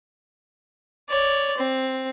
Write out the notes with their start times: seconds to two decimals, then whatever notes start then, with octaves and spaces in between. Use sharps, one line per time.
1.09 C#5 D5
1.57 C4